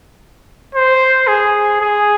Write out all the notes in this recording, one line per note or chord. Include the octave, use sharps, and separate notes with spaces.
C5
G#4
G#4